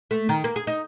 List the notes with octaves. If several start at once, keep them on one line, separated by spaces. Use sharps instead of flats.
A3
D#3
A#3
G#4
D#4